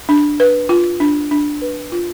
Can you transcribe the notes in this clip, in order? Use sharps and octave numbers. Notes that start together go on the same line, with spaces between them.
D4
B4
F4
D4
D4
B4
F4